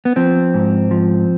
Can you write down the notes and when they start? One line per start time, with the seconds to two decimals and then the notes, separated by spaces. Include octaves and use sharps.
0.05 B3
0.16 F3 C4
0.54 G#2
0.91 F3